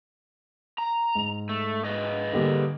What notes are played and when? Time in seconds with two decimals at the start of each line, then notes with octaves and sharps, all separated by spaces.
0.78 A#5
1.15 G#2
1.49 A3
1.85 G#4 B4 D#5
2.33 D3 G3 A#3